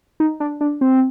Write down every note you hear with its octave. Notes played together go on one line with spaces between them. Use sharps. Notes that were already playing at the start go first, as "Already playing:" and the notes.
D#4
D4
D4
C4